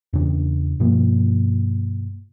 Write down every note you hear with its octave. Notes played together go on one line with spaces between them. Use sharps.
E2 C#3 D4
G2 B2 F3 A#3